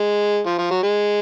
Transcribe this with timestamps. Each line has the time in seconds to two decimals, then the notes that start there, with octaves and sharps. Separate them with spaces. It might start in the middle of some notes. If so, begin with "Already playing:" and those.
Already playing: G#3
0.46 F3
0.59 F3
0.71 F#3
0.83 G#3